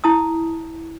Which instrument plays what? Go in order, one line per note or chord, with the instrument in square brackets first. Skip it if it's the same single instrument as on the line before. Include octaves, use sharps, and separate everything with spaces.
[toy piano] E4 A5 D#6